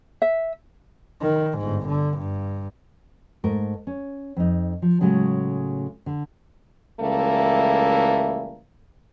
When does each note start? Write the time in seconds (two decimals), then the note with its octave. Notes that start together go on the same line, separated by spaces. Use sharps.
0.22 E5
1.22 D#3
1.59 G1 G#2
1.89 D3
2.18 G2
3.44 G#2 A3 A#4
3.87 C#4
4.37 F2 D#4
4.82 F3
5.00 A2 C#3 F#3 G#3 A3
6.06 D3
7.01 C#2 E3 G3 A3 A#3